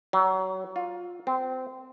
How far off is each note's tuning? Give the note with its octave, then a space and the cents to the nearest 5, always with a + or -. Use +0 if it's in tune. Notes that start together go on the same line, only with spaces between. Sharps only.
F#3 +30
F4 +20
C4 -20